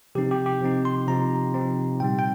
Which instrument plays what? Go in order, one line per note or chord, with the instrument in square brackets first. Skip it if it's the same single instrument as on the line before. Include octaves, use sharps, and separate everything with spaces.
[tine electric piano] C3 F3 C4 D#4 G4
G4
G4
C3 F3 C4 D#4
C6
C3 F3 C4 D#4 A#5
C3 F3 C4 D#4
A#2 G3 C4 G5
G5